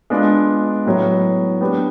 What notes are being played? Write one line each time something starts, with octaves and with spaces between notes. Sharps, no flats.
G#3 B3 D4 F4
A2 F#3 B3
B3 D4 G4 B4